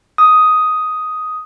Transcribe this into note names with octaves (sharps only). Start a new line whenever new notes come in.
D#6